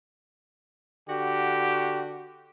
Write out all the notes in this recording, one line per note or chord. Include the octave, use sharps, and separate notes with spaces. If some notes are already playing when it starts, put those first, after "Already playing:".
D3 F#4 G4